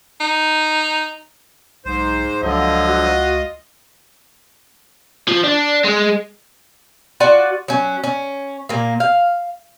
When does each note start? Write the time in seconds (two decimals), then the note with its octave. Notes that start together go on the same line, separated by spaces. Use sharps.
0.20 D#4
1.85 B1 G#2 C5
2.42 C#2 D3 F3 F#3 F4 D#5
2.87 F#4
5.29 F3
5.44 D4
5.84 G#3
7.20 F4 F#4 D5 F#5
7.68 F#3 C#4
8.04 C#4
8.69 A#2 A#3
9.00 F5